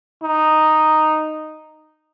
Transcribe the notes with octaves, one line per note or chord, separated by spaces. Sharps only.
D#4